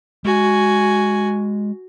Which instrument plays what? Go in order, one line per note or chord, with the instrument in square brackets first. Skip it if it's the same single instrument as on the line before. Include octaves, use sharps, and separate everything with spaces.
[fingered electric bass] G#3 [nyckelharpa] F#4 G#5